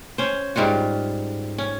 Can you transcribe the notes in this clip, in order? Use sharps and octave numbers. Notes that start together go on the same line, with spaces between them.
C#4 C5
G#2 G3 F4 F#4
C#4